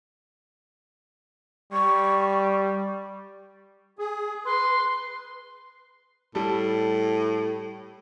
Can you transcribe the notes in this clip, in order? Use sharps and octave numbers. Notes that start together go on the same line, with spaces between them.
G3 C#6
G#4
B4 C6
A2 G3 A4